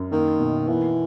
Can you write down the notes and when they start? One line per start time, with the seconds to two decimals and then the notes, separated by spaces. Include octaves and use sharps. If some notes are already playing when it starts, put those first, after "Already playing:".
Already playing: F#2
0.12 D#3 A#3
0.40 B2
0.68 E3 B3